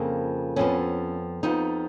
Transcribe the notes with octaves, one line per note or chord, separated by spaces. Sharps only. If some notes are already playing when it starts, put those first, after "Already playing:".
Already playing: F2 C#3 F3 A#3
F2 F3 B3 C#4
F2 F3 B3 D#4